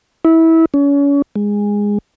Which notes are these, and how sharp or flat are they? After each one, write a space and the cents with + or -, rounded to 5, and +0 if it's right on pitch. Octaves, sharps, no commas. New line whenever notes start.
E4 -20
C#4 +35
G#3 -15